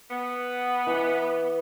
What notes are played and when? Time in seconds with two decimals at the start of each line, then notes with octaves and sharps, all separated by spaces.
0.11 B3
0.87 E3 D6